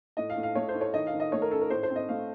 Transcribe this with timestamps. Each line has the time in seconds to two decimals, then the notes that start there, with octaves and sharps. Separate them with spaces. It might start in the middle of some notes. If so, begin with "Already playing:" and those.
0.17 A2 D#5
0.30 F5
0.37 A2
0.43 F5
0.55 A3 C#5
0.69 C5
0.75 A2
0.81 C#5
0.94 D#3 D#5
1.07 F5
1.13 D#3
1.20 D#5
1.32 A3 C#5
1.42 A#4
1.51 C#4 A4
1.61 A#4
1.70 A2 C5
1.83 C5
1.90 C4
1.96 D#5
2.09 A3 F5